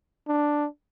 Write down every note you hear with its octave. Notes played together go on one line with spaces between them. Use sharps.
D4